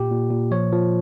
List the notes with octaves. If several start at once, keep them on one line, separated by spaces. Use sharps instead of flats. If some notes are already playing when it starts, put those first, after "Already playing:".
Already playing: A#2 G4
A#2
A#2
F3 C#5
F3